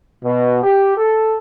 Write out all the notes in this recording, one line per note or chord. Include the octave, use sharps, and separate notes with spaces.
B2
G4
A4